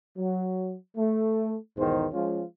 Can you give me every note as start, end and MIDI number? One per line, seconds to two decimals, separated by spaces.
0.18 0.75 54
0.97 1.55 57
1.78 2.06 35
1.78 2.06 40
1.78 2.06 44
1.78 2.06 51
1.78 2.06 63
1.78 2.06 72
2.13 2.42 53
2.13 2.42 56
2.13 2.42 61
2.13 2.42 65